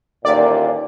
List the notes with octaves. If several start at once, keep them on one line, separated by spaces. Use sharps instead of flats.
A1 D#2 A#2 D5